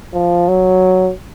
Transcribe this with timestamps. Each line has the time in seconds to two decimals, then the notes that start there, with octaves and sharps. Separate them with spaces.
0.14 F3
0.48 F#3